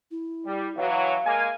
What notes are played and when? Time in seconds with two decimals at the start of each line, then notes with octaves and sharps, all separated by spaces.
0.11 E4
0.46 G3
0.77 B2 E3 F#3 F5
1.25 G#3 A#3 G#5